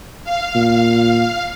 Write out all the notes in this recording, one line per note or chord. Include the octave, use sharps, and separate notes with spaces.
F5
A#2